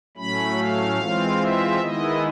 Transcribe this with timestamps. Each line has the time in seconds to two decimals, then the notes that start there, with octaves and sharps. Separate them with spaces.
0.17 A2 F#3 A3 C#4 B5
0.58 F5
0.98 E3 G#3 C4 F4
1.39 E5
1.80 D#3 G#3 B3 E4 D#5